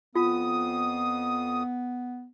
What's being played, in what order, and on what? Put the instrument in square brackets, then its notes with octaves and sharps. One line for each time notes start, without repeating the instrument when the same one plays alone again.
[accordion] F2 D#6 [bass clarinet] B3 [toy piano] F4